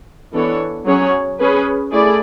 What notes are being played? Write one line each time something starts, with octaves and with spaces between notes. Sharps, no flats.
E3 B3 D4 A4 C#5
F#3 C#4 G#4 C#5
C#4 G#4 B4
A3 E4 G#4 D5